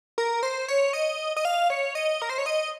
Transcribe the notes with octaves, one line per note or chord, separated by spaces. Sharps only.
A#4
C5
C#5
D#5
D#5
F5
C#5
D#5
A#4
C5
C#5
D#5